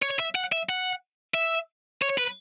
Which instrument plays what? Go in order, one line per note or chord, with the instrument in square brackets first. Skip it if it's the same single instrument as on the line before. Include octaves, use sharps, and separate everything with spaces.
[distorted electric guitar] C#5
E5
F#5
E5
F#5
E5
C#5
B4